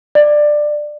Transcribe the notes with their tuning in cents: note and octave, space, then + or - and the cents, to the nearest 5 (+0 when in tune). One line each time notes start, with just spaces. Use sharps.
D5 +15